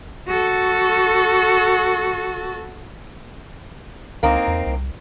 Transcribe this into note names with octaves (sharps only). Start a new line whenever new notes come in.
F#4 A4
C#2 A#3 C4 D#4
E2
C2